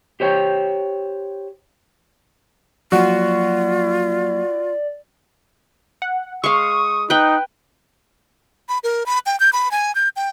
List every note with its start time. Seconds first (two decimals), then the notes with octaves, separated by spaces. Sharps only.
0.20 G4 C5 C#5 G5
2.92 F3 F#3 A#3 F4 F#4 D5
6.02 F#5
6.44 G#3 F5 C#6 D#6
7.10 D#4 B4 G5 F#6
8.69 B5
8.84 A#4
9.06 B5
9.26 G5
9.40 G6
9.53 B5
9.71 G#5
9.95 G6
10.16 G5